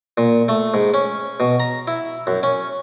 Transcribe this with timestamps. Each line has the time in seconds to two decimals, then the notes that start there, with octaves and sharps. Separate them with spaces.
0.18 A#2
0.48 A3
0.74 G#2
0.94 C#4
1.40 B2
1.60 A#5
1.88 E4
2.27 F#2
2.43 C#4